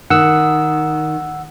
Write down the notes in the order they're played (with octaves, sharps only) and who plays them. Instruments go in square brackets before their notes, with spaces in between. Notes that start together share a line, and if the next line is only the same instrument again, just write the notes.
[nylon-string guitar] D#3 [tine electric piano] F#5 E6